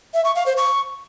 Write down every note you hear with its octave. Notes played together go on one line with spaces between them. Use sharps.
E5
C#6
F5
C5
C#6